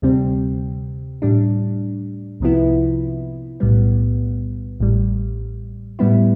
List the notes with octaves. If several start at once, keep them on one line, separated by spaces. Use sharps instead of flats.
D2 C3 G3 C4
A2 G3 D4
C2 C3 F3 B3 E4
B1 A2 G3 B3
A1 A2 G3
A2 G3 B3 E4